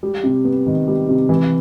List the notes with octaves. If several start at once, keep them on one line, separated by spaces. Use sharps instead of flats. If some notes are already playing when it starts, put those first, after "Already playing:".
G3
C3
B3
D#3
G3
C3
E3